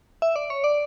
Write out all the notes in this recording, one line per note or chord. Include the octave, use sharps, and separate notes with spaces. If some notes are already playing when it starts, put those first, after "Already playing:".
E5
D5
C#5
D5